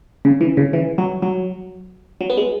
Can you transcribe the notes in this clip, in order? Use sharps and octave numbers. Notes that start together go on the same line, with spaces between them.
C#3
E3
C#3
E3
F#3
F#3
F#3
B3
G#3